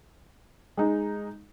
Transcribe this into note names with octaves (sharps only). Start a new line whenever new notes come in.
G#3 D#4